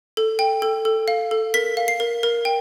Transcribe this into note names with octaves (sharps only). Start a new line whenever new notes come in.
A4
G5
A4
A4
F5
A4
A#4 B6
F5
C7
A#4
A#4
G5